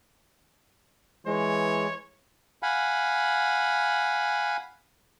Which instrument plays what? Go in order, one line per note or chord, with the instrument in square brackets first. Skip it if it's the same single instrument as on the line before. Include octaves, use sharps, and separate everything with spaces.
[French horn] E3 [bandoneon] G#3 [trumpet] C#5
[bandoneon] F5 F#5 G#5 B5